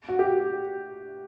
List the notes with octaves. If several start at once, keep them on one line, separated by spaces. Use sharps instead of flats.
F#4
G4